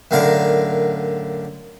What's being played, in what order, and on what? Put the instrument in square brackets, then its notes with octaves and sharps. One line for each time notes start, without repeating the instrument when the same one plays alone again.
[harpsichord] F#2 A2 D3 A#4 F5